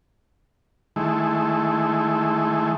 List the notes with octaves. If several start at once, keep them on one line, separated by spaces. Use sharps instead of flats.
D#3 G#3 A3 E4